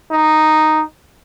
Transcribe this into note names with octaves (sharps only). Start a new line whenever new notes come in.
D#4